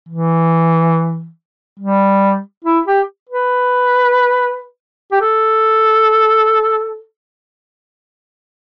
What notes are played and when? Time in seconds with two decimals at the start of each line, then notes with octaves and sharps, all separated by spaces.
0.09 E3
1.79 G3
2.64 E4
2.86 G4
3.29 B4
5.12 G4
5.21 A4